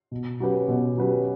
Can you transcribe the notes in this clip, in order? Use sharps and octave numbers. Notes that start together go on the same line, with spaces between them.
B2
F#3 C#4 G4 B4
B2
F#3 C#4 G4 B4